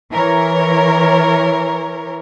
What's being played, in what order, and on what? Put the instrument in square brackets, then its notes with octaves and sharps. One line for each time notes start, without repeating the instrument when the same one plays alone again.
[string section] E3 A#4 C#5